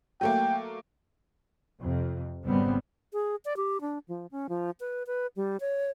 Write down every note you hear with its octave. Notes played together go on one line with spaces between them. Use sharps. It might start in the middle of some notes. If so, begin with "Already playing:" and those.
F#3 A3 A#3 G5
F2 C3
G#1 C#3 G3 B3 C4
G#4
D5
G4
D4
F3
C#4
F3
B4
B4
G3
C#5